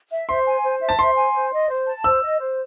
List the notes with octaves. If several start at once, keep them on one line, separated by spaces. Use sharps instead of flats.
E5
C5 C6
G#5
C5
E5
A5
C5 C6
G#5
C5
D#5
C5
A5
C5 E6
D#5
C5